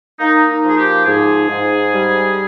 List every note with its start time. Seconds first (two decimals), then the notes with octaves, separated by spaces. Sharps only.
0.19 A#3 D#4
0.49 D#4
0.63 F3 G#4
0.77 G4
1.05 G#2 G#4
1.49 G#2
1.92 G3